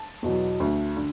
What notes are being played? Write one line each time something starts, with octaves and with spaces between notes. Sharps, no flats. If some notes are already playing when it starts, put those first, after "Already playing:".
Already playing: A5
E2 B2 F#3
D2
D3